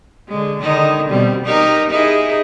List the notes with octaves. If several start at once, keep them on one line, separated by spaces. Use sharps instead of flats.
D3 G#3
D3 D#3 D#4
B2 G3 C4
D#4 G4 A#4
D#4 E4 G#4